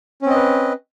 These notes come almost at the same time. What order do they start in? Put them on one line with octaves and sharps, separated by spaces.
C#4 C4 D#5 B4